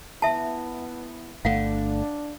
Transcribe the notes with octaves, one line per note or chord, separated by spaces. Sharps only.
B3 E4 E5 A5
G1 A3 D4 F5 F#5